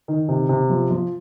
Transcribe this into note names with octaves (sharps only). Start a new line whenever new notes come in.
D#3
C3
C3
F3
F3